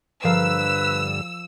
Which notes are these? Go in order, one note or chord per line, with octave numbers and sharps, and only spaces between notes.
G2 D3 F3 A#4 B4 F5 E6